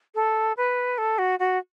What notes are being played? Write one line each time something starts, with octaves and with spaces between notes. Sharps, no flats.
A4
B4
A4
F#4
F#4